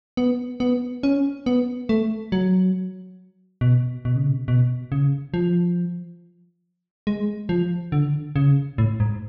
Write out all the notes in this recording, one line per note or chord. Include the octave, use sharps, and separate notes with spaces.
B3
B3
C#4
B3
A3
F#3
B2
B2
C#3
B2
B2
C#3
F3
G#3
F3
D3
C#3
A2
G#2